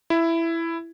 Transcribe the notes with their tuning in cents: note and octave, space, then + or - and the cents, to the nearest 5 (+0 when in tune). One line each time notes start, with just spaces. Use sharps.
E4 +10